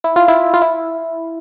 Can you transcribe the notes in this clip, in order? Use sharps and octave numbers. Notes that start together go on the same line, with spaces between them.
E4
F4
E4
F4
E4